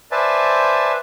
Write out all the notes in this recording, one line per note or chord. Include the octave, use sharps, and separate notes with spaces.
B4 C5 D5 E5 G#5 A5